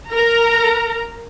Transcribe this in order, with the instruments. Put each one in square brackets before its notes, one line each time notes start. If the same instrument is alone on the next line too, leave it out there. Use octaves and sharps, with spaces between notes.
[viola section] A#4 A#5